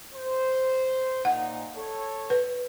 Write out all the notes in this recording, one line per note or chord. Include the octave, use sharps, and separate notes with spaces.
C5
A#2 D#4 F#5
A4 C#5
B4